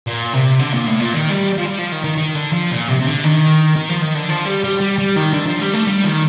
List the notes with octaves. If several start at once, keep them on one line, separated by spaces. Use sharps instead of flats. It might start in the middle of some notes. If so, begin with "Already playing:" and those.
A#2
C3
D3
A#2
A2
A#2
D#3
G3
F3
G3
F3
D#3
D#3
D#3
D3
F3
A#2
C3
C3
D3
D#3
D#3
F3
D#3
D3
F3
G3
G3
G3
G3
D#3
D3
F3
G3
A3
G3
D#3